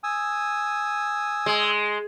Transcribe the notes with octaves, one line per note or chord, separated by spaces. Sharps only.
G#5 D#6 E6
G#3